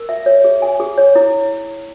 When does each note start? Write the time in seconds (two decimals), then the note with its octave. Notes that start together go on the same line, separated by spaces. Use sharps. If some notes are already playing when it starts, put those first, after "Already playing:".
Already playing: A#4
0.09 E5
0.26 C#5
0.44 G#4
0.62 G#5
0.80 G#4
0.98 C#5
1.15 E4